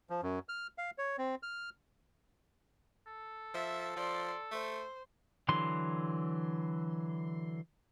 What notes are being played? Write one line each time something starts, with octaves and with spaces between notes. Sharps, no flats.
F3
F#2
F6
F5
C#5
C4
F6
A4
F3 E5
F3 D5 C6
A3 C5
D3 E3 F#3 C6